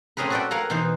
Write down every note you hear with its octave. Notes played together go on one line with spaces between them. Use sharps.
A3 C4 C#4 G#4 A#4 B4
F#4 A4 B4 D5 F#5 G5
A#4 F5 F#5 G#5 A#5
B2 E3 D#4 C5